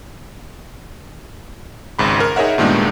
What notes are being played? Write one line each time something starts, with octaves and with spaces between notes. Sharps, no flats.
G#1 C#2 G#2 B5
A#4
D#4 G#4 A#4 C#5 E5 F#5
G2 A#2 D#3 G#3 B3 D4